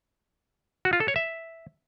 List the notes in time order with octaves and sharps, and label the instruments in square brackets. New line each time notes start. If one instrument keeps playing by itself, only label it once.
[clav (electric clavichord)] F#4
F4
A4
C#5
E5